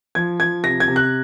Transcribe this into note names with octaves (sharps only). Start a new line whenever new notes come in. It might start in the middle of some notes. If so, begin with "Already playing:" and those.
F3 G#6
F3 G#6
C3 A#6
G#6
C3
F#6